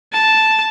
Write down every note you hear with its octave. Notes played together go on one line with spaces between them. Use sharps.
A5